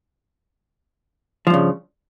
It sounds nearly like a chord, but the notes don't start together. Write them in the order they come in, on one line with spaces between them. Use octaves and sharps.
F3 G2 C#3